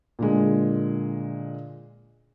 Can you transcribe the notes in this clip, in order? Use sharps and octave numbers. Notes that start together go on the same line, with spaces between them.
A#2 D3 G#3